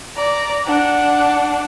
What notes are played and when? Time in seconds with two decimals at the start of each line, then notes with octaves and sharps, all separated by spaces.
0.17 D5 A#5
0.66 D4 F#5